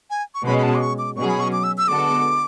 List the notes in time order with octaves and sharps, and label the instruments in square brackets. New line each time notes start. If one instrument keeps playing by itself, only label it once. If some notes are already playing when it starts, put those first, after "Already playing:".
[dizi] G#5
C#6
[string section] B2 G#3 C#4 [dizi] B5
[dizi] B5
A5
D6
C#6
D6
[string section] B2 F#3 C#4 G#4 [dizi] C#6
[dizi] B5
C#6
D6
E6
E6
[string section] D3 G#3 B3 F#4 A4 [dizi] D6